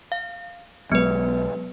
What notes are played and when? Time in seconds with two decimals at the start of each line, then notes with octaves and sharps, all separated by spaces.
0.12 F5
0.92 B1 F#3 G#3 B3 B4